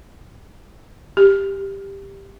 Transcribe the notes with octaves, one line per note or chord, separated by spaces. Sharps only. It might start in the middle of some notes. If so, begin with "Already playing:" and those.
G4